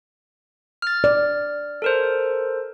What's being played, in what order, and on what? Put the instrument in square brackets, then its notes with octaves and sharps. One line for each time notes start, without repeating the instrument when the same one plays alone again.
[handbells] F6 A6
[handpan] D5
[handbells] A4 A#4 C5